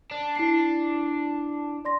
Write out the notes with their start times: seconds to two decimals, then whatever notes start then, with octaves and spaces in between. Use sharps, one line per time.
0.11 D4
0.36 E4 A5 C7
1.85 D5 C6 A#6